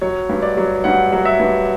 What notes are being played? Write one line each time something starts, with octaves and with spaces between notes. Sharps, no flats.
F#3 C#5
G2
D5
F#3
G2 F#5
F#3
E5
G2